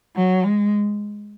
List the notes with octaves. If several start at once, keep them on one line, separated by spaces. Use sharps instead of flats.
F#3
G#3